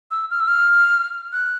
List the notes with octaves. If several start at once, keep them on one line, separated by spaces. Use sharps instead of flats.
E6
F6
E6
F6
F#6